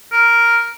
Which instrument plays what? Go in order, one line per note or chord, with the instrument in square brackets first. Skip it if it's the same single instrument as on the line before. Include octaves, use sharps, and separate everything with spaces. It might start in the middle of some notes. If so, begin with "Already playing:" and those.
[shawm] A#4